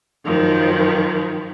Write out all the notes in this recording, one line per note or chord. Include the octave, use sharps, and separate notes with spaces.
F#2 D#3 F3